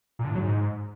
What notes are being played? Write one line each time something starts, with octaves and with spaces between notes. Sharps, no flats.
A#2
D3
A2
F#3
G#2